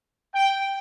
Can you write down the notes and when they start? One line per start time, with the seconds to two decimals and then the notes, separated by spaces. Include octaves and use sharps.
0.34 G5